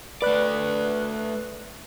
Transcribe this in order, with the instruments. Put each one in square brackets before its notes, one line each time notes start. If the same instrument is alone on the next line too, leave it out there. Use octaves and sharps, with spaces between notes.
[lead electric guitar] A3 D5 [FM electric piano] B4 F#6